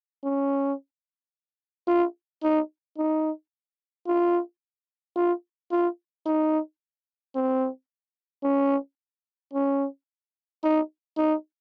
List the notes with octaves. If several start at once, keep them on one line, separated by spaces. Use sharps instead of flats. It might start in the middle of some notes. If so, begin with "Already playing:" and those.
C#4
F4
D#4
D#4
F4
F4
F4
D#4
C4
C#4
C#4
D#4
D#4